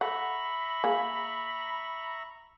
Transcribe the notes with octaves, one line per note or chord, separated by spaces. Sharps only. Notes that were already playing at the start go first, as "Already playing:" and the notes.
A4 E5 F#5 A#5 B5 C#6
A#3 G#4